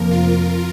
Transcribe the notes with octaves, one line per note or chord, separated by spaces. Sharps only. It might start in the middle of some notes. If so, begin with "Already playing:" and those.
Already playing: F1 F2 F3 A#3 A#4
F4